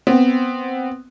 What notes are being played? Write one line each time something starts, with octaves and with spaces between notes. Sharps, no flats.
B3 C4